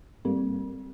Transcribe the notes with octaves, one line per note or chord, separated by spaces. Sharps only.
G#2 G3 A#3 C4